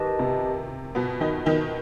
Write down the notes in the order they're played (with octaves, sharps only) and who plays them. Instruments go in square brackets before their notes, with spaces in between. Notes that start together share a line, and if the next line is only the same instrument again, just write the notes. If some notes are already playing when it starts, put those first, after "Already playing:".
Already playing: [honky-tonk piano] D#3 [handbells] G4 B4 D#5 A5
[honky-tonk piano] C3
B2 B3
D#3 D#4
D#3 D#4